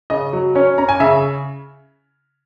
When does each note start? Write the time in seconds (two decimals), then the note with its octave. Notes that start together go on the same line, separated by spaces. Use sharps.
0.10 C#3 D#5
0.33 F#3
0.55 C#4 C#5
0.78 C#4 A#5
0.89 G#5
1.00 C#3 E5